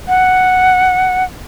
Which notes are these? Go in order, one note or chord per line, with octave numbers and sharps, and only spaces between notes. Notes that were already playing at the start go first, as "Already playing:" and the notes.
F#5